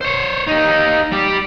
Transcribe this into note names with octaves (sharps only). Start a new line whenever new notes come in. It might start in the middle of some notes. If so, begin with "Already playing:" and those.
C5 C#5
D#4 G4
G3 G4